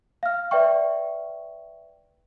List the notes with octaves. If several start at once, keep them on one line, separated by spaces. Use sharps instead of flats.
F5 F6
B4 D5 E5 G5 C#6